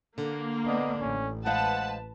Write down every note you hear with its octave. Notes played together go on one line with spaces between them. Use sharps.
D3 A#3
B3 D4 D#5
A1 C#4
G#3 B4 C5 F5 F#5 A5